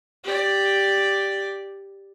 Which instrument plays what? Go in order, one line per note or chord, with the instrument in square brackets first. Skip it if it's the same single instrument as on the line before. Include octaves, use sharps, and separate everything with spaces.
[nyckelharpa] G4 D5